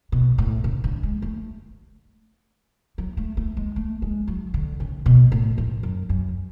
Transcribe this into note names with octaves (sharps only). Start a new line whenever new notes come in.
B2
A2
C#3
D3
G#3
A3
F#3
A3
A3
G#3
A3
G#3
F#3
D3
C#3
B2
A2
E2
F#2
F#2